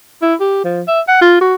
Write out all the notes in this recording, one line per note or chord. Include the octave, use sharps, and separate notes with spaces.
E4
G4
F3
E5
F#5
F4
F#4